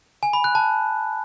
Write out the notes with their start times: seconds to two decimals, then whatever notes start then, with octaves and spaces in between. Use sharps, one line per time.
0.23 G#5
0.33 B5
0.44 F#6
0.55 A5